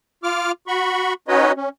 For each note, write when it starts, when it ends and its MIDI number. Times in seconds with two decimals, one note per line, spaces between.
0.24 0.52 65
0.24 0.52 86
0.24 0.52 89
0.68 1.13 66
0.68 1.13 83
0.68 1.13 85
1.28 1.52 61
1.28 1.52 63
1.28 1.52 66
1.28 1.52 71
1.28 1.52 73
1.28 1.52 75
1.56 1.69 61